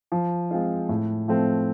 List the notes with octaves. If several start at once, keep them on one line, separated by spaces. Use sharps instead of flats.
F3
G#3 C4 F4
A2
F3 A3 C4